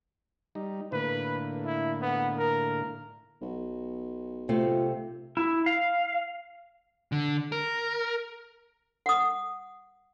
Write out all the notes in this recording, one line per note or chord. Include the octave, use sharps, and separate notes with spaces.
G3 D#4
A2 D3 A#3 B4
E4
B3
A#4
B1
C3 A3 C4 F4
E4
F5
D3
A#4
F#5 D#6